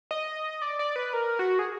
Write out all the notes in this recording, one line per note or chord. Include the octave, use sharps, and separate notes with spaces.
D#5
D5
D5
B4
A#4
F#4
G#4